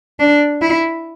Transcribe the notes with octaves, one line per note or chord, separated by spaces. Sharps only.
D4
E4